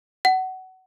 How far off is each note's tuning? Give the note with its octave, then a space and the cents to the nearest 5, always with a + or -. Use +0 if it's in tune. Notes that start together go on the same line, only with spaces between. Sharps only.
F#5 +20